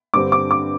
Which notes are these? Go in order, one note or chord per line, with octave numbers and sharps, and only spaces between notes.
G2 D3 G3 C4 D6
D6
D6